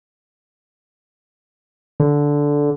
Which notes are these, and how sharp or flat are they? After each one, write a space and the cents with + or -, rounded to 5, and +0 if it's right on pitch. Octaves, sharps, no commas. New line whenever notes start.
D3 -10